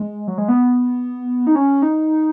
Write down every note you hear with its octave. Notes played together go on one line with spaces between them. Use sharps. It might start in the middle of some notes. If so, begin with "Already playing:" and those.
Already playing: G#3
F#3
G#3
B3
D#4
C#4
D#4